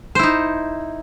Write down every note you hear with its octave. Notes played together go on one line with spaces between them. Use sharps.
D#4 E4 C5